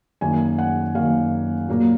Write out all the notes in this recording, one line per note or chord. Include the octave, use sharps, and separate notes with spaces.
F#2 D#3 A#3 G#5
F#5
F#2 D#3 A#3 F5
A#2 F#3 A#3